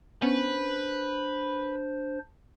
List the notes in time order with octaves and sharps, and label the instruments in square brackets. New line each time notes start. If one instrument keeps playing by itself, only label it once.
[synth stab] B3 C#4 [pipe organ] D4 C5 [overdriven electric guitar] B4